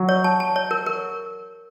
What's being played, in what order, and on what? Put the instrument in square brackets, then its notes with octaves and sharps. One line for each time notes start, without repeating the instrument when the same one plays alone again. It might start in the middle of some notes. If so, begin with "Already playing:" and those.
Already playing: [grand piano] F#3
[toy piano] C#5
A5
A5
C#5
A#4
A#4